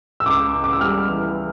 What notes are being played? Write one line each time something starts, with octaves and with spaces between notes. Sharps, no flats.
E6
C#2 D6
C#3
D6
E6
G3 F6
E3